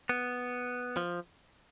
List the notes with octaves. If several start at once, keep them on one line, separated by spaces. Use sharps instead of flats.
B3
F3